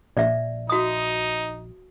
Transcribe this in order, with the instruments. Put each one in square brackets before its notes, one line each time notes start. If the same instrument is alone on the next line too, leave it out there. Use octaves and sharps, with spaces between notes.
[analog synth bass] A#1 [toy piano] D5 E5
[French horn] D#4 [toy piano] F#4 D#6